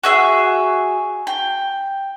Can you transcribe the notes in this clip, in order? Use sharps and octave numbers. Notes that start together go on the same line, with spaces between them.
F#4 G#4 E5
G5